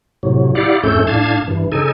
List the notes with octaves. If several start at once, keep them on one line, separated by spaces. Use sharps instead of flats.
A2 C3 F#3
E4 G4 D5 F5 F#5
F2 G#2 A3 C#4 A4 G6
A2 D4 F5 A5 G#6
G2 E3
C#3 D#4 A4 G#5